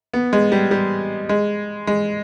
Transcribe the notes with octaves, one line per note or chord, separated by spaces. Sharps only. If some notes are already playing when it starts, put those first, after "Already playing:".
B3
G#3
G3
G3
G#3
G#3